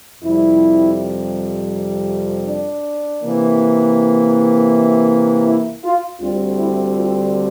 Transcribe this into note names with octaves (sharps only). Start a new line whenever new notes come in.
F2 C3 G3 E4
D4
C3 E3 A#3
E4
F4
D2 D3 G3 C4 F4
E4
F4